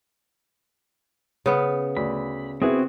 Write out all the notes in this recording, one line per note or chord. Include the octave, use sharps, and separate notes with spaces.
C#3 B3
D2 B5
B3 C4 E4 F#4 G#4